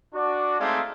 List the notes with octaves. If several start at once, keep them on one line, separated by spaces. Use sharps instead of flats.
D4 F#4 D5
G#3 A3 C4 D#4 D5 F5